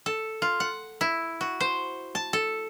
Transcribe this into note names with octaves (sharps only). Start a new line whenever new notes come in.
A4
F4
F#5
E4
F#4
C5
A5
A4